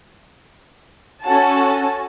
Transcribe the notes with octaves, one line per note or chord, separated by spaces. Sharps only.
C#4 F#4 A4 G#5 A5